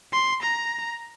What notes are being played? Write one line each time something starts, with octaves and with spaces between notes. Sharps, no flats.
C6
A#5